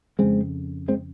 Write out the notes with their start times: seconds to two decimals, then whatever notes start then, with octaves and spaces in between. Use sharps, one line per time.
0.19 F2 C#3 G#3 C4
0.88 G#3 C4